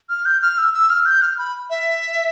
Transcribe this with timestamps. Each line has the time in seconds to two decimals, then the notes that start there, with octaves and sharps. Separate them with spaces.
0.09 F6
0.25 G6
0.42 F6
0.58 E6
0.74 E6
0.90 F6
1.06 G6
1.22 F6
1.38 B5
1.70 E5